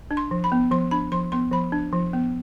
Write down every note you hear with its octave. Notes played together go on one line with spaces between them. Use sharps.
D4
C6
F3
B5
B3
F3 C6
D4 B5
F3 C6
B3 C6
F3 B5
D4
F3
B3